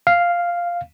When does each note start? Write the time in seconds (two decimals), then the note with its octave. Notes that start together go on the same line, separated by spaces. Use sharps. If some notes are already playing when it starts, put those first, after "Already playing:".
0.07 F5